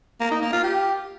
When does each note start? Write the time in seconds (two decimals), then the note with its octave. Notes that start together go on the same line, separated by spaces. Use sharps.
0.21 A#3
0.31 D#4
0.42 A#3
0.53 F4
0.64 G4